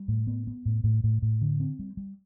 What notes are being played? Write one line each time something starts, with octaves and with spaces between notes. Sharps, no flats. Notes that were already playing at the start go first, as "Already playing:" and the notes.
Already playing: G3
A2
B3
B3
A2
A2
A2
A2
D3
C4
G3
G3